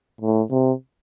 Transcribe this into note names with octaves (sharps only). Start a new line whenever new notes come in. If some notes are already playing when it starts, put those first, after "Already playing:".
A2
C3